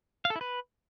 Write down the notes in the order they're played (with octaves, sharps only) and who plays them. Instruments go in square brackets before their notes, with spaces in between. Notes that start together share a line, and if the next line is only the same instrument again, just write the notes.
[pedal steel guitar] F5
A4
E4
B4